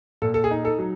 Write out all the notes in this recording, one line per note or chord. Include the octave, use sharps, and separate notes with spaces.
A#2 A4
A4
G#4
D#4
A4
F#3